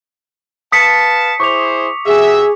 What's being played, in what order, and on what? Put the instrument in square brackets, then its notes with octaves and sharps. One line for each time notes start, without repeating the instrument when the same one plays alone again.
[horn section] B4 F5 A5 [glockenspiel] D#6 B6 C#7
[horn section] E4 G#4 C5 [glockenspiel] C#6 D6 F7
[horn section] C3 F#4 E5 [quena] G#4